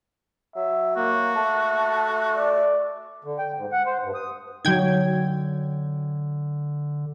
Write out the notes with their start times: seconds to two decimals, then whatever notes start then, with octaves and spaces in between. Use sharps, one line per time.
0.56 F#3 E5
0.96 A#3 F#4
1.36 A3 A5
2.36 D5
3.24 D3
3.39 G5
3.57 G#2
3.72 F#5
3.86 C5
4.03 G2
4.14 D#6
4.65 D3 F#3 D#4 G5 G#6